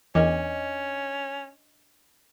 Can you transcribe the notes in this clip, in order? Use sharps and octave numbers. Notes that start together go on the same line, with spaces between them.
E2 C#4 D4 A#4 D#5 D6